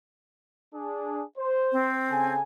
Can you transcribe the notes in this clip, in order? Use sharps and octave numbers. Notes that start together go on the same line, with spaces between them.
D4 G#4
C5
C4
C#3 A4 G#5